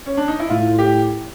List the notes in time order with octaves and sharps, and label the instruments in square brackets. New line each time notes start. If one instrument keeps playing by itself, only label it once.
[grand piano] C#4
D4
D#4
E4
[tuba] A2 [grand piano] F4
[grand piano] G4